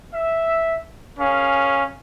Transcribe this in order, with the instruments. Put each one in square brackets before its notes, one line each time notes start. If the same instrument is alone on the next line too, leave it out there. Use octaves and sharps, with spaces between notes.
[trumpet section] E5
[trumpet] C#4 [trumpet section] G#4 A#4 F5